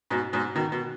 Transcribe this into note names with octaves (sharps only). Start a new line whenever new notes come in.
G#2 B2
G#2 B2
B2 D#3
B2